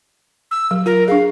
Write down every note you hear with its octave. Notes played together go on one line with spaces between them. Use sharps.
E6
F#3
F4 A#4
D4 G#4 F5